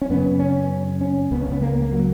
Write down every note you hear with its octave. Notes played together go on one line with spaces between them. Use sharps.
C#4
F#2 C#3 B3
C#4
C#4
C#2 C#3 B3
C#4
B3
A#3
B3
A#3
F#3